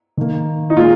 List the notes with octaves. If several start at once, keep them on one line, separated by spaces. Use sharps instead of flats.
D#3 A#3
D#4
A#2 G#3 F4